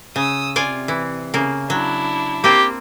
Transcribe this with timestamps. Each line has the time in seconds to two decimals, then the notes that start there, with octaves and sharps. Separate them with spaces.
0.16 C#3 D#6 E6
0.56 C3 F4 D5 G#5
0.88 E3
1.34 C#3 A#3
1.70 F#3 D4 E4
2.44 A#3 C4 G4